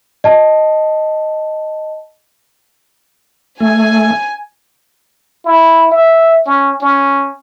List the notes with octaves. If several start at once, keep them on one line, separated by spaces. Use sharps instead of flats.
D#5 A5
A3 G#5
E4
E5
C#4
C#4